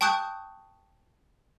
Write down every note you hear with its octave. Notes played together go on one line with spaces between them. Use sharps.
G5 A5 C#6 D#6 F#6 G6